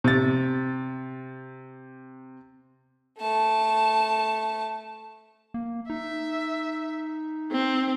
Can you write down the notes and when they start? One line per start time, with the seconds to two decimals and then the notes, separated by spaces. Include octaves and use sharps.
0.04 C3 A6
3.19 A3 A5
5.54 A#3
5.90 D#4 E5
7.52 C4